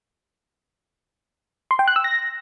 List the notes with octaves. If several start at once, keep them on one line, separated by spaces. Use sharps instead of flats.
C6
G5
F#6
E6
A#6